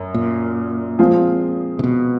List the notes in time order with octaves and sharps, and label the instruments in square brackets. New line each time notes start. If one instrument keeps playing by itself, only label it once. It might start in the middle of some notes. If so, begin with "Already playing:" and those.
Already playing: [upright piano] F#2
[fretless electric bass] A#2
[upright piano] F3 G#3 C4 F4 G#4
[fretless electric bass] C3
B2